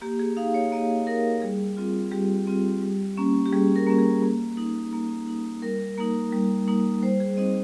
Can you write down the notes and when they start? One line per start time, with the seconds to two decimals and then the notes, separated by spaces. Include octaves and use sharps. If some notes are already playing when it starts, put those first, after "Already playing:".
0.01 A#3 G4
0.19 G#4
0.37 D#4 F5
0.54 C#5
0.72 A#3 D#5
1.07 D#4 A#4
1.42 G3 G#4
1.77 C4 F4
2.11 G3 G4
2.47 C4 F4
2.82 G3
3.17 A#3 C#4
3.46 G4
3.52 G3 G#4
3.76 A#4
3.87 A#3 C#4
3.99 G#4
4.22 A#3
4.57 D#4
4.93 A#3
5.28 D#4
5.62 G3 A#4
5.98 A#3 D#4
6.32 G3
6.68 A#3 D#4
7.02 G3 C5
7.20 G#4
7.37 C4 D#4 D#5